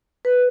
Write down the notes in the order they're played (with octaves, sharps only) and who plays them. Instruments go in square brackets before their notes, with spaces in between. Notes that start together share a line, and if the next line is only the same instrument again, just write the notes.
[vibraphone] B4